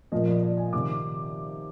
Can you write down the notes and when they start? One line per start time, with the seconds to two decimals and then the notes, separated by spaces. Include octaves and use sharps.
0.12 A#2 F3 D#5
0.27 D5
0.43 D5
0.57 G#5
0.73 C3 D#3 D6